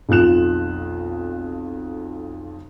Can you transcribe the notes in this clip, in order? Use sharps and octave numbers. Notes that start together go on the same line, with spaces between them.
B1 F2 F4 F#6 E7